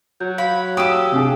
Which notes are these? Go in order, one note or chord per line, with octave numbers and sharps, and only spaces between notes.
F#3 G6
F5 B5
G4 A4 D#6
C3 D4 G#4